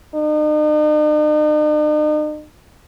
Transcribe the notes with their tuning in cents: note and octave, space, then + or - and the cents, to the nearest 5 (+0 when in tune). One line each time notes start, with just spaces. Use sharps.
D#4 -45